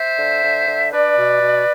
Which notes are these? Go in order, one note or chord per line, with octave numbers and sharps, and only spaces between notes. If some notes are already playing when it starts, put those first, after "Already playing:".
Already playing: C5 E5
D3
D3
D3
D4 B4 D5
B2
B2